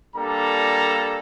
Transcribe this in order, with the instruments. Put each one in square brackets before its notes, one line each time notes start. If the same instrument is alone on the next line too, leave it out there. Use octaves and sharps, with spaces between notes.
[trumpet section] G3 A#3 D4 A4 A#5